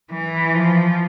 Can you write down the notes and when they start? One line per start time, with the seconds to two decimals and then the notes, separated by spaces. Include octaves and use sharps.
0.11 E3
0.54 F3